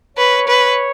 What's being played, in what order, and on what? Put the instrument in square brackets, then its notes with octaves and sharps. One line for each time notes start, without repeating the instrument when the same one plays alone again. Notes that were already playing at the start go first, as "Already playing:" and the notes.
[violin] B4 [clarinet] C#5
[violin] B4